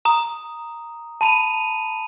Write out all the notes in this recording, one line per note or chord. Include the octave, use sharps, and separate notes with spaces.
A#5 D#6
A5 B5 D#7 F7